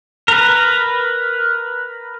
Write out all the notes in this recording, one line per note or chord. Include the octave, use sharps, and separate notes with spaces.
A#4 B4